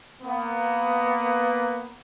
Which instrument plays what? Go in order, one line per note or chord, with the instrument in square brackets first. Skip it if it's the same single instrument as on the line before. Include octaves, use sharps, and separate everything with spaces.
[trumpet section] A#3 B3